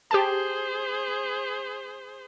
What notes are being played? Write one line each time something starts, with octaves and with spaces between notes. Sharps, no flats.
G4 G#4 C5 A5